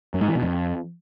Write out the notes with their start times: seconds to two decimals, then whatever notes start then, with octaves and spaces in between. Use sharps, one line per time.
0.14 F#2
0.21 G#2
0.28 E3
0.35 B2
0.42 F2